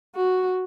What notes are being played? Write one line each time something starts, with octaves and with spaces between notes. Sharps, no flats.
F#4